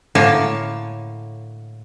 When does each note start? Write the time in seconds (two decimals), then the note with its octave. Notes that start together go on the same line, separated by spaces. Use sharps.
0.15 A2 D3 A#3 C#5 G#5 A5